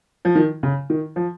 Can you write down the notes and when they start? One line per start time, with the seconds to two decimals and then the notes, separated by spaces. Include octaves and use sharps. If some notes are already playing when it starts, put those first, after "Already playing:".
0.25 F3
0.35 D#3
0.63 C#3
0.90 D#3
1.16 F3